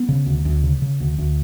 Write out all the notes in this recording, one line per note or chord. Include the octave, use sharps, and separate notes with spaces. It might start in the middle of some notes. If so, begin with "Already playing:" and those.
Already playing: B3
C#3
D2
D2
C#3
C#3
D2
D2